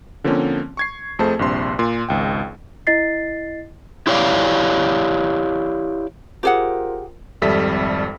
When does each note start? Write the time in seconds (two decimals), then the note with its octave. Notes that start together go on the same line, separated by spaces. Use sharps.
0.24 D3 F3 A#3 C4 C#4
0.77 C#6 G#6 C7
1.19 F2 A3 G#4 C5 A5
1.39 A#1 G2 C3 C6
1.79 A#2 C6
2.09 G#1 C#2 G5
2.87 E4 D#5 A6 C7
4.07 E4 G4 C#5 D5 F5
6.43 F4 G4 G#4 A#4 C5 F#5
7.42 G#1 F2 G3 A4 E5 B6